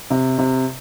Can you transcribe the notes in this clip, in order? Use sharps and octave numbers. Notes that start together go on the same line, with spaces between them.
C3
C3